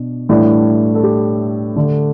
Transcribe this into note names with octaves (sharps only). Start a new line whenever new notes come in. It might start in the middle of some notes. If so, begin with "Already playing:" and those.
Already playing: B2 D4
A2 E3 G3 D4
A4
G4
D3 A3 D4